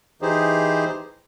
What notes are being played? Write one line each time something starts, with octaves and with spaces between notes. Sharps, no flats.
E3 D#4 G4 G#4 C5